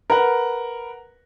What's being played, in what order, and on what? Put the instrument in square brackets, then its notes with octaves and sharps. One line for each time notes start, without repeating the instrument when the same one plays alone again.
[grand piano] A#4 B4 F#5